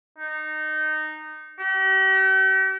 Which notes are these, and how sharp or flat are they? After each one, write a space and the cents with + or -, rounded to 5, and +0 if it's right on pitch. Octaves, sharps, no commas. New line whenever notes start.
D#4 -15
G4 -45